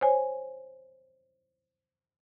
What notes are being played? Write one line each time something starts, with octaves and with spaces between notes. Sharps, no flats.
C5 C#5 G#5